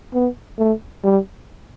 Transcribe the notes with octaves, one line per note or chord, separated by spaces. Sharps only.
B3
A3
G3